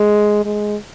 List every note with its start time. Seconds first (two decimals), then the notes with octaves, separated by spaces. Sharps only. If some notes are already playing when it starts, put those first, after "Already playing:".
Already playing: G#3
0.45 G#3